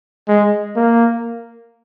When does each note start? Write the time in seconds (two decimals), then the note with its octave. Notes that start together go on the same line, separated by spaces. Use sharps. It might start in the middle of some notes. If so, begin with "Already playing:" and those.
0.28 G#3
0.76 A#3